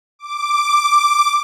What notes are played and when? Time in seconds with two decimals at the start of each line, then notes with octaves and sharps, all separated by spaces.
0.19 D6